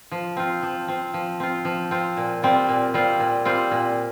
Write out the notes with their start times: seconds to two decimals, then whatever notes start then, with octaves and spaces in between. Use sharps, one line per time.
0.11 F3
0.37 C4 F4
0.63 F3
0.88 C4 F4
1.14 F3
1.40 C4 F4
1.65 F3
1.91 C4 F4
2.17 A#2
2.43 G3 C4 F4
2.69 A#2
2.94 G3 C4 F4
3.20 A#2
3.45 G3 C4 F4
3.71 A#2